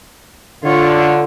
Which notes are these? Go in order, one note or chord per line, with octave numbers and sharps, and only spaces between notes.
D3 F4 C#5